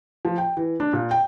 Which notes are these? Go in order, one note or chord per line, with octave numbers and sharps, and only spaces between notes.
F3
G5
E3
D4
A#2
G5